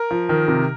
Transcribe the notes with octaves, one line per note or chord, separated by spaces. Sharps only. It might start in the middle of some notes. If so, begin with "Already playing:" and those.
Already playing: A#4
F3
D#3
C3